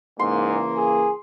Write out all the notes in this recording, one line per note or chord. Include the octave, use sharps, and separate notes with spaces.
G#2 C#3 E3 A#3 C6
G#4